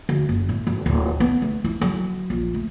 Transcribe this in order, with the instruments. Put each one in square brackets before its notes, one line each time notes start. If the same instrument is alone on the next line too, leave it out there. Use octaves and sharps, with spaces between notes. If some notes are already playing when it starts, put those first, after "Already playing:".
[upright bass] D2
F#1
A2
G#1
D1
B3
A3
E4
F#3
A#1
A3